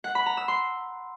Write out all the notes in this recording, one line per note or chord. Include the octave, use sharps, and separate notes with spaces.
F#5
B5
A#5
E6
C6